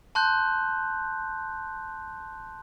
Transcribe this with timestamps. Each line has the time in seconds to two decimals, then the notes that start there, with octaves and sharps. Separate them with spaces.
0.15 A5 C6 F#6 G6